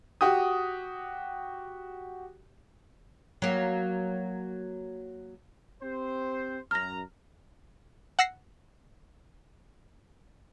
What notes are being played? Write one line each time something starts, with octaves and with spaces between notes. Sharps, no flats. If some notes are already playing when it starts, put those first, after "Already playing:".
F#4 G4 D#6
F#3 A#3
C4 G4 C5
F#2 A#5 F6 A#6
F#5 E6 A#6 C7